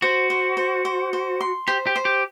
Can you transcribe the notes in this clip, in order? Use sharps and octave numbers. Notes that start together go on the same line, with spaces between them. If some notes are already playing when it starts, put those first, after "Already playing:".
F#4 C5
C5
C5
C5
C5
C6
G4 C5
G4
C5
G4